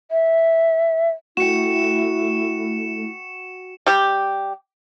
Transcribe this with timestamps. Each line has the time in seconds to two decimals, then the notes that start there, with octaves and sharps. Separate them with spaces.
0.11 E5
1.37 A3 E4 F#4 G5 C#7 E7
3.86 G3 G4